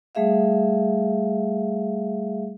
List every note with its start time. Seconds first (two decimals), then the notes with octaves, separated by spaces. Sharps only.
0.15 G3 A3 G#4 E5 F5